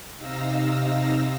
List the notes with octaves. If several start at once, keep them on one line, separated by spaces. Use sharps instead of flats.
C3 D#4 F5 E6 A#6